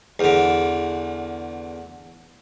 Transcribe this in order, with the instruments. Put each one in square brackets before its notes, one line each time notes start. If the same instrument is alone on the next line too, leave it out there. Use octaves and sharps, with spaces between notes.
[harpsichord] E2 D3